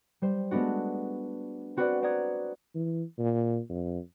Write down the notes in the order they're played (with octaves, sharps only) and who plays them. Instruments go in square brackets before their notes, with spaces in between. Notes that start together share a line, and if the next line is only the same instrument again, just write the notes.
[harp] G3 C5
G#3 A3 B3 D4 F#4
C4 F#4 B4 C5 D5 F#5
C5 D5 F#5 A#5 D#6 G#6
[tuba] E3
A#2
F2